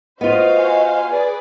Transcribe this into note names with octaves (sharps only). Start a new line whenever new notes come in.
B3 F4 F#4 C5 D#5 F5
G#5
G#4 B4 D5